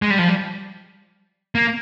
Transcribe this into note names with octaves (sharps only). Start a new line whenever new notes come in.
G#3
G3
F3
G3
A#3